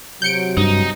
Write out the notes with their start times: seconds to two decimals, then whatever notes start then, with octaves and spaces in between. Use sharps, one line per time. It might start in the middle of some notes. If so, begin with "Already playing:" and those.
0.22 C3 F#3 G6 C#7 D7
0.57 G2 D#4